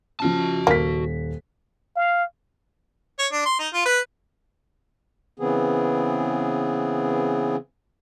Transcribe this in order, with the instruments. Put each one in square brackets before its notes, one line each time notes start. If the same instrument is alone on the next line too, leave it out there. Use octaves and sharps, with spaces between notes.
[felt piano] C#3 F3 [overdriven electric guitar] F#4 A5
[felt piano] D#1 B6 [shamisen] A#3
[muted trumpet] F5
[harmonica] C#5
D4
C6
D#4
F4
B4
[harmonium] C#3 E3 B3 C4 G#4